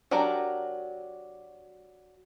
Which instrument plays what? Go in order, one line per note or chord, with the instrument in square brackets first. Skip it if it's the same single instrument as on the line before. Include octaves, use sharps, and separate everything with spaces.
[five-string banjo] F#3 D4 G4 A#4 A#5